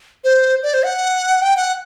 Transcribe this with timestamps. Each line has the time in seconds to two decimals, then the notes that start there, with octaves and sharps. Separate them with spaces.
0.24 C5
0.63 D5
0.74 C5
0.83 F#5
1.42 G5
1.57 F#5